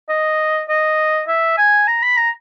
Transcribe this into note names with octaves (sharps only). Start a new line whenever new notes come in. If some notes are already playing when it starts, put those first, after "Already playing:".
D#5
D#5
E5
G#5
A#5
B5
A#5